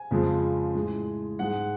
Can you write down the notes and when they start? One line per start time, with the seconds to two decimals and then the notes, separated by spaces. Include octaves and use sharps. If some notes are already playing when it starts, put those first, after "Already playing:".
Already playing: G#5
0.11 F2 C#3 F3 G#3
0.75 A2 G#3
1.39 G#2 G#3 F#5